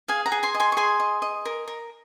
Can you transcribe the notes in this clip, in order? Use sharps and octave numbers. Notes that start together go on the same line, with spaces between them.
G#4 F5 G#5
F#5 A#5
G#4
G#5 C6
D#5
G#5 C6
C#6
G#4 G#5 C6
D#5
D#5
A#4
A#4